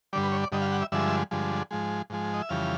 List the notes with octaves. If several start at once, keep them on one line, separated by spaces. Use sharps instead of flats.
G2 D3 G3 D5
B4
C#5
D5
G2 D3 G3 D#5
F5
F#5
E5
G2 D3 F3 G#3 E5
G2 D3 F3 G#3
G#2 F3 G#3
G#2 F3 G#3
D#5
E5
F2 C#3 E3 G3 F5